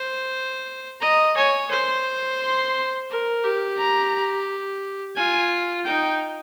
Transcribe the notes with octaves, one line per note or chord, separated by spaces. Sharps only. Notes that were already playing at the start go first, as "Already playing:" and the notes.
Already playing: C5
D#5 A#5
C#5 G#5
C5 C6
C6
A#4
G4
A#5
F4 G#5
D#4 G5